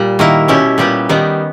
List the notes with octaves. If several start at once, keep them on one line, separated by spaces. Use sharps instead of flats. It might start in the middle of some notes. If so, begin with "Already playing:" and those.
Already playing: A#2 G3
D#3 A#3 E4
B2 G3 C#4 E4 G4
A#2 G3 B3 G4
D#3 G3 B3 D#4